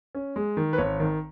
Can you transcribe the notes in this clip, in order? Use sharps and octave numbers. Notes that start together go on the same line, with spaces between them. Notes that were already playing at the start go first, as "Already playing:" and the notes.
C#4
G#3
D#3
B4
G#1 C#5
D#3